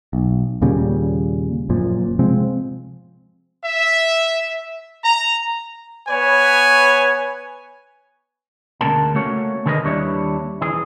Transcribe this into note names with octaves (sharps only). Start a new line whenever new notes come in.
B1
D#2 A#2 C#3 G3
F#1 F#2 A#2 F3
C3 F3 G#3 C4
E5
A#5
B3 B4 C#5 G#5
D2 C#3 A#3 C4 A#4 A5
A3 A#3 C#4 F#4 C#5
D3 D#3 G#4 A#4 B4 D#5
D#2 G3 D4 E4 C#5
E3 G#4